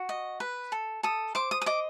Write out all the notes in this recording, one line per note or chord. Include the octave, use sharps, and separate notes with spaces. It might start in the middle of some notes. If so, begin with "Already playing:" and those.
Already playing: F#4
D#5
B4
A4
A4 D#6
C5 D6
D#6
D#6
D#5 D6